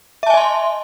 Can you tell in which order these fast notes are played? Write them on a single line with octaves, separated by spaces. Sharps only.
E5 A5 G#5 D#5 C6